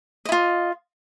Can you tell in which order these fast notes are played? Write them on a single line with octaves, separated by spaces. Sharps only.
D#5 E4 F4